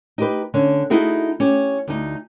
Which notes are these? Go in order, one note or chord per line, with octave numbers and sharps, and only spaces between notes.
D#4 G4 B4
D3 C#4
D#4 E4 F#4 G#4 A4
C#4 G4
D2 D#4